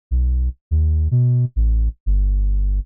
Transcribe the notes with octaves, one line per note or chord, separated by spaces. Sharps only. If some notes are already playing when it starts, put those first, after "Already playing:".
B1
D#2
B2
A1
G1